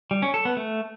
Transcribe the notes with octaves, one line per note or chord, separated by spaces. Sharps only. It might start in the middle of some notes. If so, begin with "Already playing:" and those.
G3
C#4
A4
B3
A3